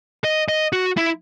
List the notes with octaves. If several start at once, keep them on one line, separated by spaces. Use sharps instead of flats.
D#5
D#5
F#4
E4